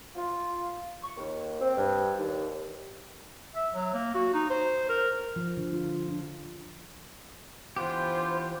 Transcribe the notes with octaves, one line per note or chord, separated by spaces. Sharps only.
F4
C#6
D#2
C4
G2
D#2
E5
F#3
A#3
F#4
D#4
C5
A#4
F3
D3
F4
D4
E3 B3 D4 F4 G4 C5